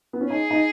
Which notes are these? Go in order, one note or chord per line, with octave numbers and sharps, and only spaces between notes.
B3
C#4
D#4 G#4
D#4